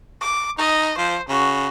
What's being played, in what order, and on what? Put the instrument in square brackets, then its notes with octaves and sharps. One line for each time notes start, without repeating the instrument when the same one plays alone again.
[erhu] D6
[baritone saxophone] D#4 [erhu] D#5
[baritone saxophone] F3 [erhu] C5
[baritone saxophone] C#3 [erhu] F#4